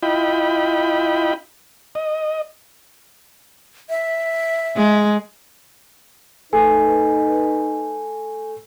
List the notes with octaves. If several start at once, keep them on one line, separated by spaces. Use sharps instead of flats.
E4 F4 D#5 G5 B5
D#5
E5
G#3
A3 D#4 B4 G#5